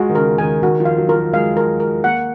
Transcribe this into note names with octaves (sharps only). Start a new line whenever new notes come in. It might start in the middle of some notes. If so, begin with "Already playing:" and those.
Already playing: G#3 F4 F#4
D#3
C#3 A#4
D#3 G#5
D#3 F#4
F3
F5
F#3
F3 A#4
F#3
G#3 F5
A#4
A#4
A#3 F#5